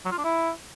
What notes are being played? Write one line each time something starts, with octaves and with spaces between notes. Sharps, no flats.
F#3
F4
D4
E4